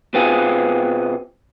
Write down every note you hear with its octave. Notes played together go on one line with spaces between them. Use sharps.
B2 B3 C4 F4 G#4